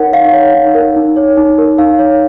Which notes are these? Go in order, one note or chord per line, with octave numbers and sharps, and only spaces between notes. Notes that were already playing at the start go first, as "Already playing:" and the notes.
Already playing: D#4 A#4 C#5 F#5
D#4 F5
C#5
D#4
A#4
D#4
C#5
D#4
A#4
D#4 F5
C#5